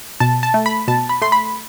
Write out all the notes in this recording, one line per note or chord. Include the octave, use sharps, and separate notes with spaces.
B2 A5
A5
A3
B5
B2 A5
B5
A3 C6
B5